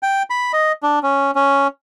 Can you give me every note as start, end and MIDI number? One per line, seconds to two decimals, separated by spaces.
0.03 0.23 79
0.30 0.52 83
0.53 0.72 75
0.83 0.99 62
1.03 1.31 61
1.35 1.67 61